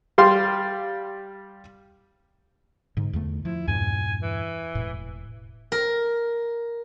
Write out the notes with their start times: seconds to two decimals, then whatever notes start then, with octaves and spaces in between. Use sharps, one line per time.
0.18 G3 F5 C6
2.97 G#2 D3
3.13 E2 D3 A3
3.45 F3 E4
3.67 E2 G2 A#2 G#5
4.22 E3
4.75 E1 A2
5.72 A#4